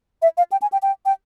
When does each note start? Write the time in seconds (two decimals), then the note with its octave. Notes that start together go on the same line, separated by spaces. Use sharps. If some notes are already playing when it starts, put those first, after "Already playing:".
0.22 E5
0.38 F5
0.52 G5
0.62 G#5
0.72 G5
0.82 G5
1.06 G5